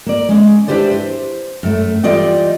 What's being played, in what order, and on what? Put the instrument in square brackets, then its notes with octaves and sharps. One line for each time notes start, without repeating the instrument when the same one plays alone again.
[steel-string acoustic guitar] A#3 D5
G#3 C#4
D4 E4 G4 B4 C5 D5
C5
F#2 A3
E3 G3 F4 D5 D#5 G5